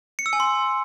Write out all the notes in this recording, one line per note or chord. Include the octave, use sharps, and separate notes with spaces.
C#7
E6
G#5
C6